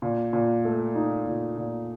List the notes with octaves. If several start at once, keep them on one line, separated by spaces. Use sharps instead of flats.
A#2
A#2
A3
D#4
A#2
A#2